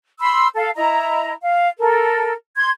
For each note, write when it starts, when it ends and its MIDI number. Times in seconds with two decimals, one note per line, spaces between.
0.20 0.48 83
0.20 0.48 84
0.20 0.48 88
0.55 0.70 69
0.55 0.70 77
0.76 1.33 64
0.76 1.33 75
0.76 1.33 82
1.42 1.67 77
1.79 2.33 69
1.79 2.33 70
2.56 2.70 84
2.56 2.70 92